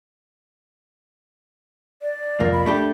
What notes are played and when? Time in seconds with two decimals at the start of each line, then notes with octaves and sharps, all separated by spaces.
2.02 D5
2.40 C2 F2 A#3
2.52 B5
2.66 A3 D4 G4